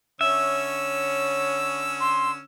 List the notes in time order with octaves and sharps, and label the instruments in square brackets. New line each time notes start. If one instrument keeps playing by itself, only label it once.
[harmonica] D3 C#4 E6 [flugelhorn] C#5 [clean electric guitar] E5
[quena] C6